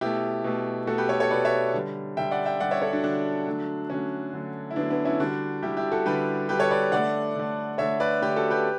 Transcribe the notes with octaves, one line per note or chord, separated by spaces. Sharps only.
B2 A3 E4 G4
B2 A3
B2 A3 F#4 A4
G4 B4
A4 C#5
A4 C#5
B2 A3 B4 D5
C#5 E5
D3 G3
D3 G3 E5 G5
D5 F#5
E5 G5
D3 G3 D5 F#5
C#5 E5
A4 C#5
D4 F#4
D3 G3 D4 F#4
D3 F#3 A3
D3 F#3 A3 C#4
D3 F#3 A3
E4
D3 F#3 A3 B3 D4
B3 D4
C#4 E4
D3 G3 D4 F#4
D3 G3 E4 G4
E4 G4
F#4 A4
D3 G3 G4 B4
D3 G3 G4 B4
A4 C#5
B4 D5
D3 A3 D5 F#5
D3 A3
D3 A3 C#5 E5
B4 D5
D3 A3 G4 B4
F#4 A4
G4 B4